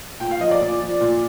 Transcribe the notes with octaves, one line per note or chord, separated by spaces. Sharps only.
A#2 G5
F5
F3 D#5
D5
A#2
F3
A#2